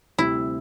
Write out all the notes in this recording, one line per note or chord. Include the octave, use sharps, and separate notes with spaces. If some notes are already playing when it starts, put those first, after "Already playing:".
D2 C3 G3 C4 E4